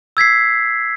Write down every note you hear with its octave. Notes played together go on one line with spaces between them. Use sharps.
E6 G#6 B6 C7